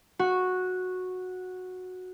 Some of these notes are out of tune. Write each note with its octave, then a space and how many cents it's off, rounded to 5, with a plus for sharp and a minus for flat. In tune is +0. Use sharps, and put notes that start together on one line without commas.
F#4 -10